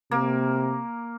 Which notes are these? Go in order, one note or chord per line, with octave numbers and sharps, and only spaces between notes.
C3 A#3